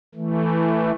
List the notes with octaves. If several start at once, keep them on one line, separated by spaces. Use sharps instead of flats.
E3 A3